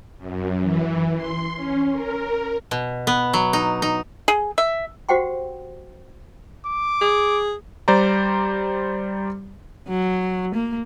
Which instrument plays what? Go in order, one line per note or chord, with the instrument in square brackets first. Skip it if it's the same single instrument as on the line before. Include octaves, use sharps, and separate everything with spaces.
[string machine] F#2
E3
C6
C#4
A#4
[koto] B2
B3
F#3
D#4
D#4
[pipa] G#4
E5
[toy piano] F#4 G4 C5 F#5 G5 C6
[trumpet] D6
[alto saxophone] G#4
[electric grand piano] G3 C5 D5 A#5
[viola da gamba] F#3
A#3